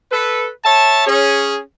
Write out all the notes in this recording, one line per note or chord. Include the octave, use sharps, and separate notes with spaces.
A4 B4
C#5 E5 A5
C#4 G#4